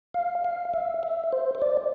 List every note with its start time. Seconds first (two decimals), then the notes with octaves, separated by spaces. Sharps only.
0.14 F5
0.44 F5
0.74 E5
1.03 E5
1.32 C5
1.55 C5
1.62 D5